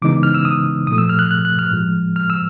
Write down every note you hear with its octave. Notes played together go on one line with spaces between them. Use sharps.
C#3 E3 G#3 B3 D#4 D6
F6
E6
D#6
A#2 F3 A3 D#6
E6
F6
F#6
F#6
F#6
F6
A2 F3 G#3
F6
E6